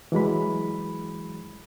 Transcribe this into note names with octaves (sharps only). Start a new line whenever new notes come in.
E3 F#3 G#3 B5